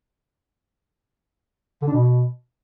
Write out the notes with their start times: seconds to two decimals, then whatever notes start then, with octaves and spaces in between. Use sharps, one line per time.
1.82 D3
1.87 D4
1.93 B2